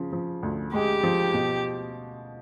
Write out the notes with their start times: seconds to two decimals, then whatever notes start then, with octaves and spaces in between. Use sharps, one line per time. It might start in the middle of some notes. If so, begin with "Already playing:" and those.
Already playing: C#3 F3
0.13 F3
0.43 D2
0.73 G#3 G4
1.03 F3
1.34 B2